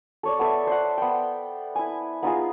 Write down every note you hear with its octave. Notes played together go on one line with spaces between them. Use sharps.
A4 C#5 D5
B3 A4 E5
C5 D5 F#5
B3 G5
E4 G#5
B3 D#4 F4 G#4